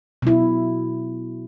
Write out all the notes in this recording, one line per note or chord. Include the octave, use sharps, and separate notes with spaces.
B2 F#3 E4